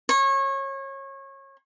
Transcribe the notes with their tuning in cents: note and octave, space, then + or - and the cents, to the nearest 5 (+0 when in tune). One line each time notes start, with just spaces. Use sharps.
C#5 -25